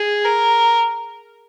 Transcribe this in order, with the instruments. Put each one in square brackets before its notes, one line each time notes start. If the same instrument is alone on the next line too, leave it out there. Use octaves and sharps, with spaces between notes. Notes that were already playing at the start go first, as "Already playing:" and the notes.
Already playing: [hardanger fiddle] G#4
A#4